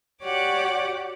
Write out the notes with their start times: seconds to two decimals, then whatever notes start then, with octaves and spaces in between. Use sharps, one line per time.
0.22 F#4 G4 C#5 D5 F#5 D6